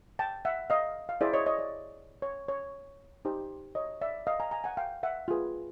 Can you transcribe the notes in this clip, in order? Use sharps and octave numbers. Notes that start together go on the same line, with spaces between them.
G5 A5
E5 F#5
D#5 F5
F5
E4 G#4 C5 D5 E5
C#5 D#5
C#5 D#5
D5
C#5
C#5
D#4 G4 C5
C#5 D#5
D5 E5
D#5 F5
G#5 A#5
G#5 A#5
F#5 G#5
F5 G5
E5 F#5
F4 G#4 B4